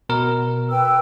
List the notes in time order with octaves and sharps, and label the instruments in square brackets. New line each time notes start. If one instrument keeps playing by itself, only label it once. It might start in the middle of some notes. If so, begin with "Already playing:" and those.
[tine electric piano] B2 A#4
[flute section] B4 G5 E6